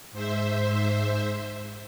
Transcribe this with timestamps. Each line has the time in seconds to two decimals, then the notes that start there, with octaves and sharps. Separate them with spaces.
0.12 G#2 C5 E5